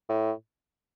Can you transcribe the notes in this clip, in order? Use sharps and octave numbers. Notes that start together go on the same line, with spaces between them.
A2